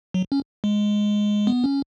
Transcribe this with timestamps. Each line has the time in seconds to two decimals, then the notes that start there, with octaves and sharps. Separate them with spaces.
0.14 F#3
0.32 C#4
0.64 G#3
1.47 B3
1.64 C#4